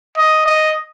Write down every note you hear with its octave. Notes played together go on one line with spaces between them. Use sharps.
D#5
D#5